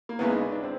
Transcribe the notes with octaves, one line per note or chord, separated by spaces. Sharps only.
A#3
E2 C#3 E3 G#3 B3
D#4
D4
D4
C4